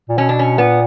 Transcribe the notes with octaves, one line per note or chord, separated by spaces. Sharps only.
A#2
B2 C#4
D4
C#4
A#2 B3